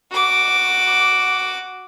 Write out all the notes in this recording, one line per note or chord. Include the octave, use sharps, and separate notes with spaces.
F#4 D6